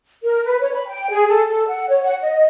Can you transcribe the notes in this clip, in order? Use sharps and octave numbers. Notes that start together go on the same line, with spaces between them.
A#4
B4
C#5
B5
G5
G#4
A4
A4
F#5
C#5
F#5
D#5